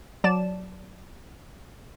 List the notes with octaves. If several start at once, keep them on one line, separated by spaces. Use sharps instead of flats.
F#3 D5 A5 E7